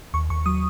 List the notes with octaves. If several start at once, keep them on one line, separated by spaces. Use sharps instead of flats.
D#2 C#6
D#2 C#6
F#3 D#6